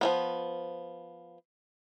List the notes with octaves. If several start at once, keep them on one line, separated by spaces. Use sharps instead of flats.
F3 F#3 B3